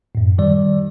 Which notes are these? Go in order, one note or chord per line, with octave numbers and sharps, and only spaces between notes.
F#2 A2
D#3 G3 D5